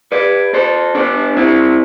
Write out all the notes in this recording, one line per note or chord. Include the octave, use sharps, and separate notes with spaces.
B4 D5
A4 C5
B3 D4
C4 E4